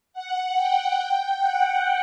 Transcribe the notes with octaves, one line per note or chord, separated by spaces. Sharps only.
F#5
G5
G5
F#5